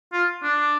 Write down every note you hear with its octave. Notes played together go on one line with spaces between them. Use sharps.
F4
D4